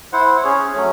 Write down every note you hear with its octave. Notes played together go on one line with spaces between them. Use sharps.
E4 C5 F#5
C#4 G#4 C#5
F#3 A3 C#4